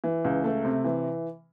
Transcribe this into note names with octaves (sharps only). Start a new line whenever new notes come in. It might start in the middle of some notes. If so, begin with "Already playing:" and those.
E3
C#2
A3
C3
E3